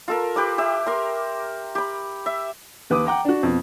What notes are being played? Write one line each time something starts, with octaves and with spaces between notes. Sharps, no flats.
F4 A4 A#4
G4 B4 D6
G4 E5
A#4 C6
G4 B5
E5
D#2 B4 D6 D#6
F#5 G5 A#5 D6
D4 F#4
F2 B2